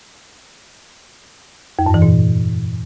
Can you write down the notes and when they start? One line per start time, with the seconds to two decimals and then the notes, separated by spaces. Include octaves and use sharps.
1.79 F2
1.86 G2
1.94 E3
2.02 A#2